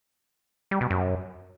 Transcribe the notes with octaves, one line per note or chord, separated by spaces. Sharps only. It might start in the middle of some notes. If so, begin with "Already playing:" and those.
G3
B2
F#2